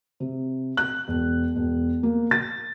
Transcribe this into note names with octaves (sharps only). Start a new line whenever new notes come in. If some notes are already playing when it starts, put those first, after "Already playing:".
C3
F#6
E1
E1
A#3
A6